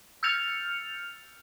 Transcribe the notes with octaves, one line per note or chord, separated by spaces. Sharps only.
E6 F6 G6 A6 C#7 F7